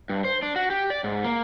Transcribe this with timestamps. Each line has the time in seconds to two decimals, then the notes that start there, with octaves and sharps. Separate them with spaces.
0.09 G2
0.24 C5
0.42 D4
0.56 F#4
0.70 G4
0.90 D5
1.04 G#2
1.24 A#3